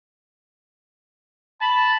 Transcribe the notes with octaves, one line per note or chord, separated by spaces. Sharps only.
A5 B5